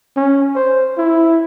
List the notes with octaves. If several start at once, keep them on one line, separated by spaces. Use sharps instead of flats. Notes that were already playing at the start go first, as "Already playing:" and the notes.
C#4
C5
E4